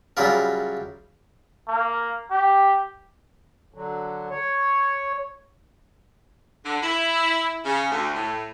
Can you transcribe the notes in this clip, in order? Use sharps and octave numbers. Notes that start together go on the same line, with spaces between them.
C#3 F#3 G3 E4 F4 A#4
A#3
G4
D3 F#3
C#5
D3
E4
C#3
D2
A2